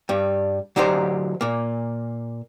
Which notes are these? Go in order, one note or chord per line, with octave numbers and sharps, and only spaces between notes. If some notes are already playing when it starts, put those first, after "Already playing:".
G2 G3
D3 F#3 D#4 G4 A#4 C5
A#2 A#3